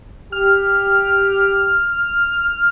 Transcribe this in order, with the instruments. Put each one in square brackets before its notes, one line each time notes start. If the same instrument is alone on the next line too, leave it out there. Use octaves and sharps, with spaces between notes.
[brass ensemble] G4 [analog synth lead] F6